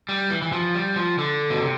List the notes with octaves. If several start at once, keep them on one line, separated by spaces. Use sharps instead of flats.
G3
E3
E3
F3
G3
F3
D3
B2
C3